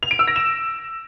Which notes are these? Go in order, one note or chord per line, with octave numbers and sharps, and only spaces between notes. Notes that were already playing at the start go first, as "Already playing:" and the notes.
F7
D7
E6
A#6
E7